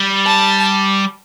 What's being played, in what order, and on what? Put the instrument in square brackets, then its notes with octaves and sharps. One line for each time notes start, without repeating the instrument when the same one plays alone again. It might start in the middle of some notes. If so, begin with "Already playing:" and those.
Already playing: [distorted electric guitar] G3
[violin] A5